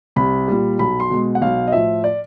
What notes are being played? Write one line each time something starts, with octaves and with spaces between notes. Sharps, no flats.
C2 B5
A#2 G3
B1 B5
C6
B2 G#3
F#5
B1 F5
D#5
A2 F3 E5
D5